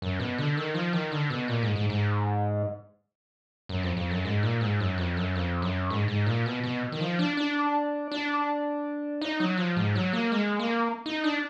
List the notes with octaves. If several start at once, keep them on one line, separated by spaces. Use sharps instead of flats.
F#2
B2
D3
D#3
F3
D#3
D3
B2
A#2
G#2
G#2
G#2
F#2
F2
F2
F#2
G#2
A#2
G#2
F#2
F2
F#2
F2
F#2
G#2
G#2
A#2
B2
B2
D#3
F3
D4
D4
D4
D#4
F#3
F3
G#2
F#3
A#3
G#3
A#3
D#4
D4